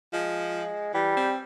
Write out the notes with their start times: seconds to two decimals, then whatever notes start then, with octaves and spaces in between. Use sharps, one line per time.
0.13 F3 G#3
0.94 E3 G3
1.17 C4